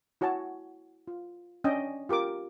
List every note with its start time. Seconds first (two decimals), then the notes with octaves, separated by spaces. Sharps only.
0.21 E4 F#4 C#5 G#5 A5
1.08 F4
1.64 C#4 D4 D#5 G5
2.09 F4 G4 A#4 D6